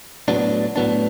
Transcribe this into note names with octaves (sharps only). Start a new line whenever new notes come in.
A2 F#3 B3 D4
A2 F#3 B3 D4